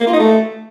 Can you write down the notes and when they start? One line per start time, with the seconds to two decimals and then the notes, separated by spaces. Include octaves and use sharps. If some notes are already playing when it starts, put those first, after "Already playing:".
0.01 A#3
0.07 F4
0.13 D#4
0.20 A3